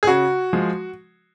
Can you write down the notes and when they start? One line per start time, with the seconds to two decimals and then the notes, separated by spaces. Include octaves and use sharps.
0.03 G#4
0.07 C#3 F#4
0.53 F3 G#3